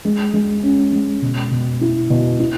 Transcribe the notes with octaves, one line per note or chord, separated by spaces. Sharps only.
G#3
G#3
C#4
G#3
B2
B2
E4
B2
E4